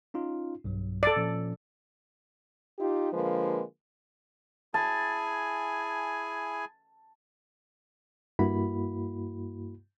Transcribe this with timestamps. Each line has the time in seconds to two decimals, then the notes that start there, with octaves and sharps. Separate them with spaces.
0.14 C#4 D#4 F4
0.64 B1 G2 F#3
1.03 A4 D5
1.16 A#2 F3 C#4
2.79 D#4 F4 G4
3.13 D3 F3 G#3 A#3 B4
4.74 E4 G#4 G#5 A5
8.39 G2 A#3 E4 F#4 B5